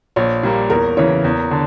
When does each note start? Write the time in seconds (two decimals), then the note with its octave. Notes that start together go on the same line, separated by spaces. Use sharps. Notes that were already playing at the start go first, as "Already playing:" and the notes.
0.16 A#1 C#5
0.43 A#2 G3 A#3
0.70 E2 A#4
0.97 C#3 E3 C#5
1.24 E2
1.51 D3